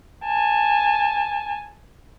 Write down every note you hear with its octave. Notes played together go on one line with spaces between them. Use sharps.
G#5 A5